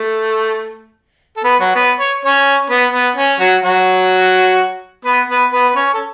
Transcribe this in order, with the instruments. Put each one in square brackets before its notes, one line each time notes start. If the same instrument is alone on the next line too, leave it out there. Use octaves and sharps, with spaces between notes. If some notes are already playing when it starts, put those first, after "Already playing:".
Already playing: [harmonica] A3 A4
A4
B3 B4
F#3 F#4
B3 B4
C#5
C#4 C#5
B3 B4
B3
C#4
F#3 F#4
F#3 F#4
B3 B4
B3 B4
B3 B4
B4
C#4 C#5
A4